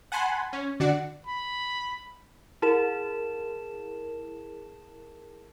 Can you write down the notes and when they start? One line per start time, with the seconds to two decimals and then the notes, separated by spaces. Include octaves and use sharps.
0.12 F#5 G#5 A5 B5 C6
0.53 C#4
0.80 D3 D4 F#4 D5 F#5
1.27 B5
2.62 E4 G#4 A#4 A5 E7